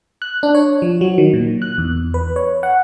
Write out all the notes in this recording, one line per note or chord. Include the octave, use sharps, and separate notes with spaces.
F#6
D4
C#5
F3
F#3
D#3
A#2
F#6
E2
B4
C#5
F#5